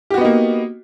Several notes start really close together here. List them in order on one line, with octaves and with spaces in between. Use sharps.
G4 F#4 B3 D#4 A#3